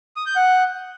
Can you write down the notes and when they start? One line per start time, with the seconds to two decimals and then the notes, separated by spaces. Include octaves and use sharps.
0.17 D#6
0.26 G6
0.36 F#5